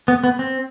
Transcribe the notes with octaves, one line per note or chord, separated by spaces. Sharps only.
B3
B3
C4